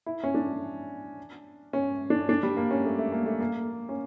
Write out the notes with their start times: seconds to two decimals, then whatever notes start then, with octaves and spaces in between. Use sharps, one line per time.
0.06 E4
0.24 C#4
0.34 D4
1.73 C#4
2.10 D4
2.29 D4
2.43 G3
2.57 A#3
2.71 C#4
2.85 A3
2.98 A3
3.12 A#3
3.26 A3
3.40 A#3
3.89 C#4